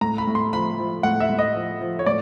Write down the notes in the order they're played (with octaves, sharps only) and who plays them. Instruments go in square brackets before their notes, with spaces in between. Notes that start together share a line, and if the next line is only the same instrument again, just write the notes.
[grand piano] A2 A#5
B5
A2
C6
F3 B5
F3
A2 F#5
E5
A2
D#5
F3
F3
C#5
A2 D5